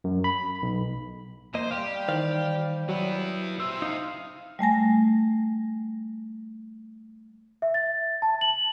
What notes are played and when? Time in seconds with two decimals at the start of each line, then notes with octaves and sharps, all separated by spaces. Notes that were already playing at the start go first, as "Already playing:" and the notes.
0.04 F#2
0.24 B5
0.62 B1
1.54 E2 A#3 C5 D#5
1.71 G3 G4 F5
2.08 D#3 E3 C5 D5 F5
2.89 F#3 B3 E4
3.60 C5 E5 E6
3.82 D#4 F5
4.59 G3 A3 G#5 A#6
7.62 E5
7.74 A6
8.22 A5
8.41 F#7